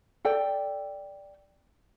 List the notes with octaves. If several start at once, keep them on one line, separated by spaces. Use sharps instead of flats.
A4 D5 G5